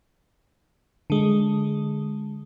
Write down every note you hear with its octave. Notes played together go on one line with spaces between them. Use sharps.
D3 G#3